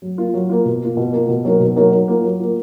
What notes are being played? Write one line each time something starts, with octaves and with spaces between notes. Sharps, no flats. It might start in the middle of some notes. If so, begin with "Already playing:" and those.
F#3
A#3 F4
F#3
A#3 F4
B2
A#3 F4
B2
A#3 F4
B2
F#3 A#3 D#4 A#4
B2
F#3 A#3 D#4 A#4
F#3
A#3 F4
F#3
A#3 F4